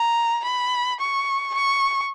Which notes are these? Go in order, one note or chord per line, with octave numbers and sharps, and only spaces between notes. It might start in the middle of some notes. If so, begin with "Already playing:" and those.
Already playing: A#5
B5
C#6
C#6